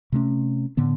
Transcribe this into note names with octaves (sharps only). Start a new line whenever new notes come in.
C3 A3 C#4
A2 D3 B3